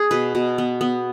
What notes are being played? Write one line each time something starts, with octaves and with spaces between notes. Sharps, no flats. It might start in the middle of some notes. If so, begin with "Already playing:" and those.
Already playing: G#4
B2 B4
B2
B3
B3